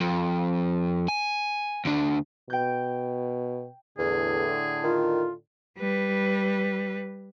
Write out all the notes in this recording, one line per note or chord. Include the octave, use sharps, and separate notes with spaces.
F2
G#5
D2 D4
B2 G5 G6
E2 A2 D3 G#4
D#3 F4
G3 B4